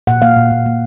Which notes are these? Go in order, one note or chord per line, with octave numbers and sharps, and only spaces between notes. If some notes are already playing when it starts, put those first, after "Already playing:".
A#2 F#5
A#3 F5
A#2
A#2
A#3